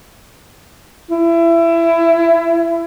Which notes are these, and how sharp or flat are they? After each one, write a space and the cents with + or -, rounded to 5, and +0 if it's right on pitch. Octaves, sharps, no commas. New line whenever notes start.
E4 +25